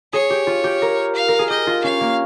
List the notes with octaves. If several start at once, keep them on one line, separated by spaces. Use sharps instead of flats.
G#4 C#5
G4
F4
G4
A#4
F5
A#4
G#4
G4 D#5
F4
C#4 F5
A#3